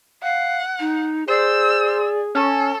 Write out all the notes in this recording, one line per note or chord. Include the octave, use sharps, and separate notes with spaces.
F5 F#5
D#4
G#4 C5 D5 E6
C#4 A4